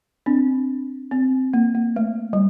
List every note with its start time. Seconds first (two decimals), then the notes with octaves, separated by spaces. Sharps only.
0.26 C4 D4
1.11 C4
1.53 A#3
1.75 A#3
1.96 A3
2.33 G3